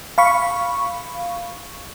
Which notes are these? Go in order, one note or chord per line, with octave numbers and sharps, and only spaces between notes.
F5 B5 C#6